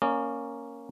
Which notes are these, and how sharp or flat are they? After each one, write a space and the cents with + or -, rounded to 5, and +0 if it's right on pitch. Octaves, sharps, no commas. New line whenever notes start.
A#3 +0 C#4 +0 D5 +45